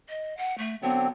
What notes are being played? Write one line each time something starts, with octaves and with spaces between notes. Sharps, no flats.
D#5
F#5
A3
D3 F#3 B3 C4